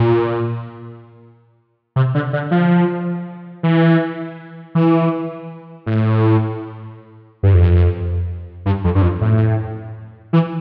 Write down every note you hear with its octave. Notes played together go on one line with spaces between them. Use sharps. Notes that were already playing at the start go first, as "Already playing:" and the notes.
Already playing: A#2
C3
D3
D3
F3
E3
E3
A2
G2
F2
G2
F2
G2
F2
A2
E3